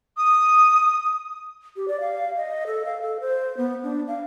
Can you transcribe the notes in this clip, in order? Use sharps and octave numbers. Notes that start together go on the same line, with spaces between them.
D#6
G4
D5
F5
D#5
A4
F5
A4
C5
B3
D4
F5